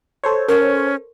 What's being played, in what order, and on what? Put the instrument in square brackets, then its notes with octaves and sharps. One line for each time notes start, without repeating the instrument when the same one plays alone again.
[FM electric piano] A4 C5 C#5
[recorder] C#4 [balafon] A#4